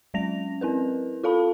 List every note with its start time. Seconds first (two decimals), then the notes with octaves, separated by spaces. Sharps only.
0.14 F#3 G#3 C#4 A#6 F7
0.61 C4 E4 A#4 B4
1.24 F4 A4 F5 A5 B5